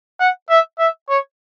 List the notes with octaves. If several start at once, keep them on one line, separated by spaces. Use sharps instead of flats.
F#5
E5
E5
C#5